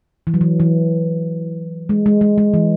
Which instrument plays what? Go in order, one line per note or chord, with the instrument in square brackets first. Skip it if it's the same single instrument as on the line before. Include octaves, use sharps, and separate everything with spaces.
[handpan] E3
F#3
E3
E3
G#3
G#3
G#3
G#3
E3